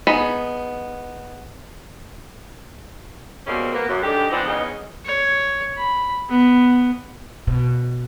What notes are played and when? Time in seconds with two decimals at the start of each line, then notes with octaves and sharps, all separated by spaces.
0.07 B3 D#4 G#4 B5
3.46 B2 G3 G#3 A#3 C4 C#4
3.73 A#3 B3
3.87 F#2
4.02 G#2 D3 G#3 G4
4.29 E3 F3 B3 C4 D4 D#4
4.46 E3 B3 C#4 D#4 G#4 D#5
5.05 C#5
5.78 B5
6.29 B3
7.47 B2